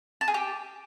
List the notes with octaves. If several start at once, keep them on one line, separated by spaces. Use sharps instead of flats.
A5
G#4
G4